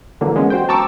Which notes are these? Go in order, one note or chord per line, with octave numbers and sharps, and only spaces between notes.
D3 E3 F#3 A#3
G#3 B3 C#4
F#4 C5 G5
A5 A#5 C#6 D6 E6